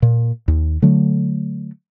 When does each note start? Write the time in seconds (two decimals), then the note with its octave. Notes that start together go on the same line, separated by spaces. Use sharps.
0.02 A#2
0.48 D#2
0.82 D3 F#3 A3